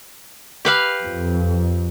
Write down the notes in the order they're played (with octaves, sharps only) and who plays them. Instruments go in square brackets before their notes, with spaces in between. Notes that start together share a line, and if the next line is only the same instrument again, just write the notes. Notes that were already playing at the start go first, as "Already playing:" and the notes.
[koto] G4 B4 F5
[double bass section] F2